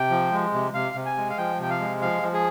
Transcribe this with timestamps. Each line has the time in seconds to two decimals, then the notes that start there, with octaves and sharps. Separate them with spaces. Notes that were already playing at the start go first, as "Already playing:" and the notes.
Already playing: C3 G5
0.10 F3
0.32 G#3
0.54 C3
0.74 C3 F5
0.95 C3
1.06 G#5
1.17 G#3
1.30 F5
1.38 F3 G5
1.59 C3 G5
1.70 F5
1.80 G#3
2.02 F3 F5
2.23 F3
2.34 G#4